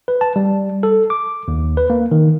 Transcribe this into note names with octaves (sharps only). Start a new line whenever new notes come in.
B4
A5
G3
A4
D6
D#2
B4
A#3
D#3